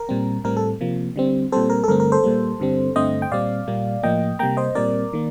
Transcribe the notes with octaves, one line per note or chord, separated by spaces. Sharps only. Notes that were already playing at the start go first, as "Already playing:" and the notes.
Already playing: A#4
A#2 G3 C4
A2 G3 C4 A#4
A4
C3 F3 A#3
D3 G3 C4
A#2 G3 C4 A4 C5
A#4
A4
G2 D3 A3 C4 A#4
A#4
A4 C5
A#2 G3 A#3
G2 D3 G3 C4
G2 D3 A3 C4 C5 D#5
G5
A#2 G3 C4 D5 F5
A#2 G3 A#3
A2 F3 A#3 D#5 G5
C3 G3 A#3 G5 A#5
C5 D#5
A#2 G3 C4 A#4 D5
D#3 A#3